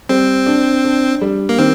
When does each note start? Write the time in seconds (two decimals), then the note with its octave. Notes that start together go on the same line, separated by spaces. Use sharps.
0.09 G3 C4
0.46 D4
0.85 D4
1.21 G3
1.49 A#3
1.58 D#3 C4